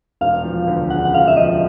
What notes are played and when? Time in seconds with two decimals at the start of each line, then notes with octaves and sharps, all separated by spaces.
0.21 E1 F5
0.44 F3
0.67 D2
0.90 C#3 F#5
1.05 F#5
1.14 E1 F5
1.28 E5
1.37 F3 D#5